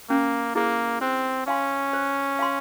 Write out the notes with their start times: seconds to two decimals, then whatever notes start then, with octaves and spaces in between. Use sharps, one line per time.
0.10 A#3 C#4
0.55 A#3 E4 G#4 C5
1.01 C4 C5
1.47 C#4 F5 G#5 C6
1.93 C5
2.39 F5 G#5 C6